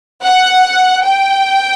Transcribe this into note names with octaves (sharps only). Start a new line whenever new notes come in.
F#5
G5